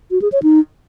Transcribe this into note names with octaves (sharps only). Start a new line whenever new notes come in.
F#4
G#4
C#5
D#4